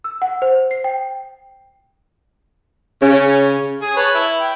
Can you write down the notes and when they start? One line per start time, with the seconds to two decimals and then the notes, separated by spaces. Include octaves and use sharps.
0.04 E6
0.22 F#5
0.42 C5
0.71 C7
0.84 G5
3.02 C#3 C#4
3.81 G#4
3.96 B4 C#5 A5
4.14 E4
4.40 G5